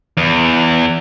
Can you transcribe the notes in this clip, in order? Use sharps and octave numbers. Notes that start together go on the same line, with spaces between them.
E2